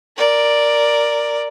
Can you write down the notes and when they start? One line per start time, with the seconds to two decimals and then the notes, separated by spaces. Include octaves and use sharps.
0.17 A#4 D5